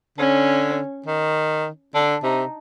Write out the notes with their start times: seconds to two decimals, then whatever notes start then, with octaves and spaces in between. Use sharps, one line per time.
0.18 D3 C#4
1.06 D#3
1.94 D3 D4
2.23 C3 D#4